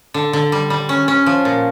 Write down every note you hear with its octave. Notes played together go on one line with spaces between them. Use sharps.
D3
D3
G3
G3
C#4
C#4
F3
A#2